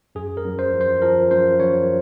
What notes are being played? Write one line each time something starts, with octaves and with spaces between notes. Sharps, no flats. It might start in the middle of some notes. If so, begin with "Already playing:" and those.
F#2 G#4
A#4
F#2
C5
F3
C5
F3 A#4
F#2 C5
F#2 C#5